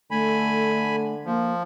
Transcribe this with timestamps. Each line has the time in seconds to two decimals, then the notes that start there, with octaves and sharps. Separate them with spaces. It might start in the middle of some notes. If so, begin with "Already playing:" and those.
0.11 D3 A3 G#5 B5
1.26 F3 A#3